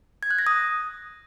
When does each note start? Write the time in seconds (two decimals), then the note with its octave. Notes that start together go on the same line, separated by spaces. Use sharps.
0.23 G#6
0.31 F#6
0.39 A#6
0.47 D#6